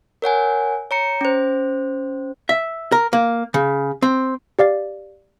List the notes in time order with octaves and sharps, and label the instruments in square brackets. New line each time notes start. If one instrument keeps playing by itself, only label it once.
[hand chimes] A#4 C#5 F#5 G#5
C#5 A#5 C#7
C#4 C5
[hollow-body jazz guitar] E5
A#4
A#3
C#3
C4
[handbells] G4 D5 F5 A6